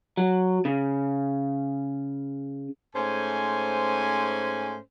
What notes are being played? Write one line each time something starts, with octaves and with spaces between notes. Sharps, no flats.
F#3
C#3
G#2 A3 C#4 C5 G#5